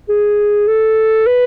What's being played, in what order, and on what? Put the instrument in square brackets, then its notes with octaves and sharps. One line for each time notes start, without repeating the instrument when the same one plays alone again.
[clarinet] G#4
A4
B4